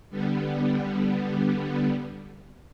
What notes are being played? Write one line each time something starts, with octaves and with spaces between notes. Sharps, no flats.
D3 G3 B3